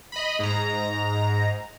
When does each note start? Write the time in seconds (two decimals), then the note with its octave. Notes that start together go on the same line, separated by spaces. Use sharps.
0.12 D#5 B5
0.39 G#2 A#5